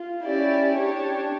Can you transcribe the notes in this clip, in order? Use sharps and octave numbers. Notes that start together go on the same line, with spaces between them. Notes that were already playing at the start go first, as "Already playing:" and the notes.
Already playing: F4
C#4 E4 G4 D5
D4 G4 C#5